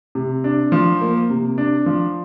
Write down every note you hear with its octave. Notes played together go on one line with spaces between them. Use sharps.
C3
D4
F3
A#3
C3
D4
F3